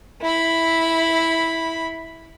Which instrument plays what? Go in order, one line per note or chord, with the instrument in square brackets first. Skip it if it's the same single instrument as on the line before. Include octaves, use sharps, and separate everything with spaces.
[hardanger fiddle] E4 B5